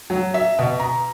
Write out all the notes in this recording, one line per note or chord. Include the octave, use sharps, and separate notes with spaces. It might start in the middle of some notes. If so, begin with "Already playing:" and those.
F#3
E5
B2
A#5